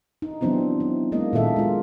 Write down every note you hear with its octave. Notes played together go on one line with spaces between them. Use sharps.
D#4
E3 F#3 B3 C4 D4 E4
E3
G#3 A#3 D#4 D#5
A#2 D#3 F4 A4 E5
G#3 F4